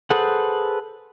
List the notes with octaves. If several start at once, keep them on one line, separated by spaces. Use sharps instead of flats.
G#4 A4 B4 C5 F#5